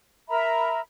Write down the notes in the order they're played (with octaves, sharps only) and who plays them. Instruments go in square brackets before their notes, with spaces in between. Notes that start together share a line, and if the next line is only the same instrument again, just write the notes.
[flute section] A#4 E5 A#5 B5